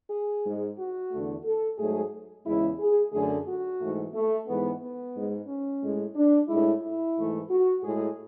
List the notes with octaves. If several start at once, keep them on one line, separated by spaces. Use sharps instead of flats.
G#4
G#2 G#3
F#4
E2 D3 A3
A4
G#2 F#3 A3 G#4
E2 C#3 G#3 E4
G#4
F#2 D3 A3 G#4
F#4
G#2 E3 A3
A3
G#2 E3 G#3 B3
B3
G#2 G#3
C#4
A2 G#3
D4
A2 G#3 E4
E4
G#2 E3 A3
F#4
A2 G#3 G#4